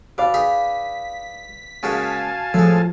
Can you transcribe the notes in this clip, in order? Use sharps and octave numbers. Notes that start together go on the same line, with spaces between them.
B2 B4 D5 F5
D#4 G#4 B6
C#3 G#3 A#3 F#4 F5 G#5 A5
A2 F3 G#3